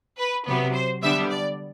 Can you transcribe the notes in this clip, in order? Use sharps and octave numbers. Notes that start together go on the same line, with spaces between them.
B4
C3 F#3 B3
C5
D3 G3 B3 D4 E5
D5